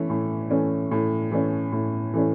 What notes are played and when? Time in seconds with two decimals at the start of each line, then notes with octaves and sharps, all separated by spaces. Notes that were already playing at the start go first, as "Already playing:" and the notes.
Already playing: E3 A3 C#4
0.10 A2
0.50 E3 A3 C#4
0.91 A2
1.31 E3 A3 C#4
1.72 A2
2.14 E3 A3 C#4